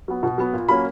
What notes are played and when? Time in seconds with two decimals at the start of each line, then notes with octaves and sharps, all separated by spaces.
0.08 F#3 B3
0.23 B2
0.38 F#3 B3
0.53 A#2
0.69 F#3 A#3 C#4 B5